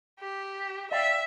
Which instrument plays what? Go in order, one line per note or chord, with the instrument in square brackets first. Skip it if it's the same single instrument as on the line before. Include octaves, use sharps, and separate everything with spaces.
[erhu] G4
[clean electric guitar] D5 F5 G5 [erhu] E5